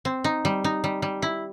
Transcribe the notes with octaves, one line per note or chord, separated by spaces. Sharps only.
C4
D#4
G3
D#4
G3
G3
E4